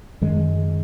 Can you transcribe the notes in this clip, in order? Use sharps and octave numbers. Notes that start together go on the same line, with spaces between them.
F#2 D#3 G#3